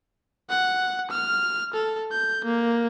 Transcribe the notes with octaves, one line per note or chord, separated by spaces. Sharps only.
F#5
F6
A4
G6
A#3